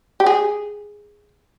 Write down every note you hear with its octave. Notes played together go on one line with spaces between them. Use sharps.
G4
G#4